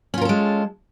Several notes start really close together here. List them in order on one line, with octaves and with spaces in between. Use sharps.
C#4 F4 A#4 A4 G#3